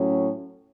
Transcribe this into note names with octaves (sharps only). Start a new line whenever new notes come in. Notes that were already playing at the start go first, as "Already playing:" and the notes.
Already playing: A2 F#3 C#4